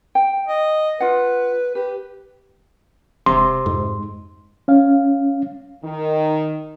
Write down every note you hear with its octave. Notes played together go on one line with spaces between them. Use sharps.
G5
D#5
F4 B4 F#5
G4 B4
E1 C3 C6
F2 G#2
C#4 F5
D#3